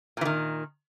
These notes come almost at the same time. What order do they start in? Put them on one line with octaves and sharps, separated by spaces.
A#2 E3 D#3